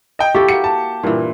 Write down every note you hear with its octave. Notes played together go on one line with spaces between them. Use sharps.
D#5 G5
E4 F4 G4 A4 C#6
A#3 F#4 C#7
A5
G2 A#2 E3